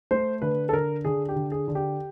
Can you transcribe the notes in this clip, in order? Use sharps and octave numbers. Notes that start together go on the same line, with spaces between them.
A3 C5
D3 B4
A4
D3 A#4
D3 G#4
G4
D3
G#4
D3
G4